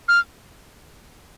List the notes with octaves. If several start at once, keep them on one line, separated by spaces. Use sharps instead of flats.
F6